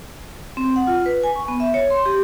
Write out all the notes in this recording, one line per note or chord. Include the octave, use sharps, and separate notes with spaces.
C4
F#5
F4
B4
G#5
C#6
B3
E5
C#5
C6
G4